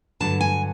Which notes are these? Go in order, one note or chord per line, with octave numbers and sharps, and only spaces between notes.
G2 D3 F#3 A5
G#5